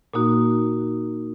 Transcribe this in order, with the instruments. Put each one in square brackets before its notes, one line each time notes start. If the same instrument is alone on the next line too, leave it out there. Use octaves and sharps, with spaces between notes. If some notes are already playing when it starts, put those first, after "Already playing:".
[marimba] A#2 A#3 D#4 F#4